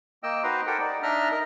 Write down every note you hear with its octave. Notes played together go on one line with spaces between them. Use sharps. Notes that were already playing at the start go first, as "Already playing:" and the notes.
A#3 D#5 G5 E6
D#4 F#4 B4 C5 A#5 C6
G4 A4 A#4 C5 F#5 G5
D#4 D5
D4 D#4 D#5 E5 A#5 F6
A#4 D#5